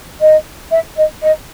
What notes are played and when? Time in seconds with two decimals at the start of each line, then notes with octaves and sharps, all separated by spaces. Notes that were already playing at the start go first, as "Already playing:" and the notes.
0.20 D#5
0.71 E5
0.97 D#5
1.22 D#5